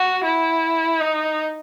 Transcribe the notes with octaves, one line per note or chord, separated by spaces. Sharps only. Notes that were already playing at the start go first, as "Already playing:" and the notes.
Already playing: F#4
E4
D#4